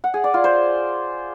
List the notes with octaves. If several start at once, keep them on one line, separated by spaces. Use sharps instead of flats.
F#5
G#4
D5
F4
C5